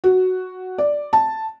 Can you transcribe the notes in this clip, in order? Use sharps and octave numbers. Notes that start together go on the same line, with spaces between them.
F#4
D5
A5